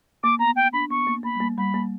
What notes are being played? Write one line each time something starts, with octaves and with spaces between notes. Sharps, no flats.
A#3 D6
B3 A#5
G5
D4 B5
B3 C#6
A#3
A#3 B5
G3
A#3
G3 B5
A#3